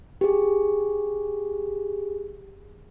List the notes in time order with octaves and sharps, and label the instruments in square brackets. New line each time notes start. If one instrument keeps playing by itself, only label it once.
[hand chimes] G4 G#4